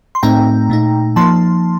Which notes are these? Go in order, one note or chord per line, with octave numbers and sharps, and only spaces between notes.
C6
A2 A3 C4 D#4 G5 A#5
A#2 A3 D#4
F3 A#3 D#4 A5 C6